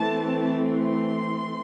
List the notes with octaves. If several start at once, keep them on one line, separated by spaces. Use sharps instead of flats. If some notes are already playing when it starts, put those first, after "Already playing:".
Already playing: E3 A3 C4 A5
C6